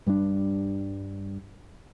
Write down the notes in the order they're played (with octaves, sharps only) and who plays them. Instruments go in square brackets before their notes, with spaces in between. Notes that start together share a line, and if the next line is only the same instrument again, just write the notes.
[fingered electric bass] G2 G3 C4 D4